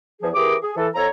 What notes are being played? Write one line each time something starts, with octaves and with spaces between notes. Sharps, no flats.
E2 E3 F3 G#4
E3 G4 G#4 A#4 D6
G#4
E3 A4
F2 F3 A4 C#5 A#5